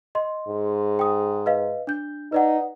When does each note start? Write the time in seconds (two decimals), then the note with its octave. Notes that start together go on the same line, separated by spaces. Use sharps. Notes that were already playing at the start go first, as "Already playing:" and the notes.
0.15 D#5 C6
0.49 G#2
0.99 G5 D#6
1.46 B4 D#5 F5
1.87 D4 G6
2.32 D#4 B4 D5 F#5